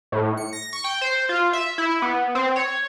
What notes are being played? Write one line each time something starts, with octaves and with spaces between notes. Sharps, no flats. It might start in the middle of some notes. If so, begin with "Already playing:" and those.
A2
C#7
A#6
C#6
G5
C5
F4
E5
E4
B3
C4
C#5